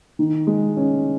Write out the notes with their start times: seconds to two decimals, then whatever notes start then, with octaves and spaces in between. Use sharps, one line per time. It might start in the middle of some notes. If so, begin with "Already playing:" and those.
0.19 D#3
0.47 G#3
0.77 C#4